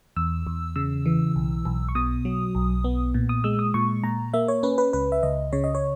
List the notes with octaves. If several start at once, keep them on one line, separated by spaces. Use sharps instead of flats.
E2 E6
E2
C#3 E6
E3
B1
B1
C#6
B2 D#6
F#3
B1
B3
A#2
D#6
G#3 E6
D#6
A#2 C#6
A#2 A#5
A#3 E5
C#5
C#4 B4
B4
C#2 B4
E5
C#2 D#5
C#3 C#5
D#5
C#5